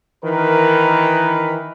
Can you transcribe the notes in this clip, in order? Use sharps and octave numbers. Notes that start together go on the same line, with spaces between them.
D#3 E3 A#4 B4